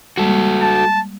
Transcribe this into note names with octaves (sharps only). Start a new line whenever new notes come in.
G3 G#3 A#3 F#4 A4
A5